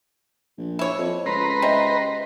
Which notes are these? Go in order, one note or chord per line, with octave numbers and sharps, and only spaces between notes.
A#1
E4 C#5
F2
C#2 B4 A#5 C6
G3 C5 D#5 E5